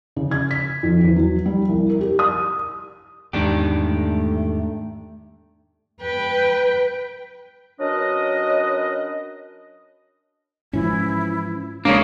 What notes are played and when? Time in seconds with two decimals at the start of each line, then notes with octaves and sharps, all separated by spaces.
0.16 C#3
0.31 G#6
0.51 B6
0.83 F2
1.04 E2
1.16 F#3
1.46 G3
1.69 C2
1.90 A#4
2.01 G4
2.19 D#6
3.33 E2 G#2 D#3 D4 G4
3.78 A3
6.01 B4 G5
7.79 F#3 C#4 D4 A#4 B4 D#5
10.73 G#2 E3 F3 C#4 E4
11.85 D#1 C#3 G#3 A#3 C#4 D4 C#5